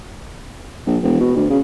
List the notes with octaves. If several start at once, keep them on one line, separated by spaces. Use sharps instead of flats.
A#1
E1
B2
D2
C#3